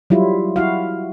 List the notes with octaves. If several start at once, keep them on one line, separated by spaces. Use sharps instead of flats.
F#3 G3 E4 F4
E4 F#4 F5